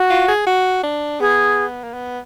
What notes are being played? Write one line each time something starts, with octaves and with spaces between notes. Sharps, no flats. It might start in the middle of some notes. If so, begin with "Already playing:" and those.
Already playing: F#4
F4
G#4
F#4
D4
B3 G#4
A#3
B3